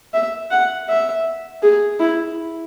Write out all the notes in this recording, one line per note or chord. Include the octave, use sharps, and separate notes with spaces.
E5
F#5
E5
G#4
E4